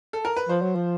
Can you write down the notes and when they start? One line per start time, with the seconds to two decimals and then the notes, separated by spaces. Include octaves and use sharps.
0.13 A4
0.25 A#4
0.36 B4
0.49 F3 C5
0.62 F#3
0.75 F3